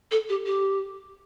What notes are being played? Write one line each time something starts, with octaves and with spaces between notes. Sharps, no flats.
A4
G4
G4